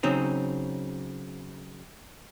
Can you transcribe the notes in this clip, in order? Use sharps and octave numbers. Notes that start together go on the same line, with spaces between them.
C#3 F#3 C4 D#4